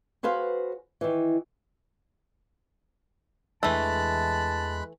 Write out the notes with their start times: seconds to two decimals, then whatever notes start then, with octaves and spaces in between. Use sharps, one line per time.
0.23 F#4 G#4 B4 C5 F5
1.01 D#3 E3
3.63 E2 E3 G#3 A3 D4 A5 B5 F#6